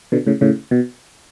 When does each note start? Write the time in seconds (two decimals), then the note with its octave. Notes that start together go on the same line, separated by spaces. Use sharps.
0.12 B2 D3
0.27 A2 C#3
0.41 A2 C#3
0.71 B2